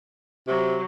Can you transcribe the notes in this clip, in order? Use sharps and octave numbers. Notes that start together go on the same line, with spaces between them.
C3 F#3